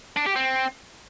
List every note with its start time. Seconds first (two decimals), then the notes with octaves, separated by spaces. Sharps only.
0.17 D4
0.26 G4
0.36 C4